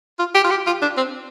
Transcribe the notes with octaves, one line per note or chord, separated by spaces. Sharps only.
F4
G4
F4
G4
F4
D4
C4